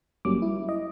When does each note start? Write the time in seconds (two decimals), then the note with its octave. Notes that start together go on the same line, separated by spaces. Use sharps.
0.25 G1 F#3 G3 A#3 C#4 D6
0.42 E4
0.69 D#5